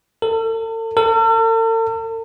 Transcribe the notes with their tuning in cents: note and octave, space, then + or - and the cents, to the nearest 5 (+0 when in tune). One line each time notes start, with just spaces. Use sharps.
A4 +40
A4 +45